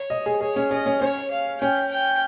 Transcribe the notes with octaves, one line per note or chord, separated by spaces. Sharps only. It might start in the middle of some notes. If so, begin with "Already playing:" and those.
Already playing: C#5
D#5
G#4
G#4 C#5
C#4
C#4 D#5
C#4
C#4 C#5
F5
C#4 G5
G5